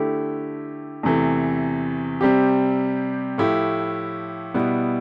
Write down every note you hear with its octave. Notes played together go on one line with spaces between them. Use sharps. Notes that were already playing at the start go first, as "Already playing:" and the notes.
Already playing: D3 A3 E4 G4
E2 C3 E3 A3
C3 G3 C4 G4
A2 F3 A3 E4 G4
B2 G3 B3 E4